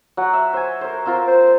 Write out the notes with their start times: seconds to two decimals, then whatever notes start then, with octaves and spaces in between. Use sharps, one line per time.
0.17 F#3 F#5
0.33 E5
0.53 C5 G#5
0.81 A#4 C5
1.06 C4 F4 A#4
1.27 C5